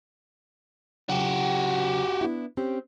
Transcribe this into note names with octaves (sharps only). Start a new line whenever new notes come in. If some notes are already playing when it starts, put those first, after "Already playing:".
C#3 F#3 F#4 G4
B3 D4 E4
C4 C#4 G4